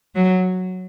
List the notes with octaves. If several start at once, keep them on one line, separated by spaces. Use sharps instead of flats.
F#3